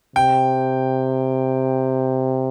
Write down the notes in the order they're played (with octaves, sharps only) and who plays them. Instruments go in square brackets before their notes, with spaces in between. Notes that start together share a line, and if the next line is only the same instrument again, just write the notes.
[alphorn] C3 [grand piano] G5